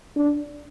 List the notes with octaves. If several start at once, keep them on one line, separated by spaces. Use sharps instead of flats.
D4